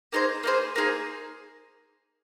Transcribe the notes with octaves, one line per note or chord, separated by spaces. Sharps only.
A#3 D#4 G#4 C5
A#3 D#4 G#4 C5
A#3 D#4 G#4 C5